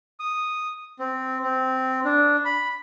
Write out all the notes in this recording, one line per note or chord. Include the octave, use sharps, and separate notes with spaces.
D#6
C4
C4
D4
B5